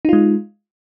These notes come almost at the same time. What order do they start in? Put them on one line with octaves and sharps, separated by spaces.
D#4 F4 G#3